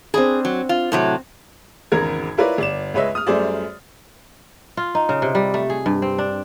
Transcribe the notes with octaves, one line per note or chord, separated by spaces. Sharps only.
C4 D4 G#4 B5
F#3
F4
A2 C3 F#3
G#1 E2 C#3 A#4 G#6
E4 F4 A#4 B4 C#5 D5
G1 D5 E7
C#2 G#3 B4 C#5 D#5 E5
D#6 F6
F#2 G3 A3 G#4 C5 D5
F4
D#4
C#3
C3
G3
A3
G#4
G2
C4
D4